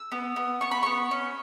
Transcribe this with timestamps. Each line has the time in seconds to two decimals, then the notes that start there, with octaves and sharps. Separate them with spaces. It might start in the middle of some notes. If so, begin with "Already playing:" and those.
Already playing: E6
0.12 B3
0.36 B3
0.61 B3 C#6
0.71 B5
0.83 B3 C#6
1.11 C#4